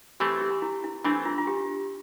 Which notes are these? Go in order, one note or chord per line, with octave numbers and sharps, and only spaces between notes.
E3 A3 C4 G4
G4
E4
E4
E3 A3 C4 D4
F4
F4
G4